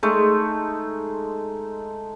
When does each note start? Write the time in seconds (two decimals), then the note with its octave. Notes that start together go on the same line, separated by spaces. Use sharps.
0.03 G#3 A3 D#4